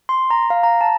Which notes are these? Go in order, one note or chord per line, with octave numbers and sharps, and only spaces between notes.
C6
A#5
F5
A#5
A5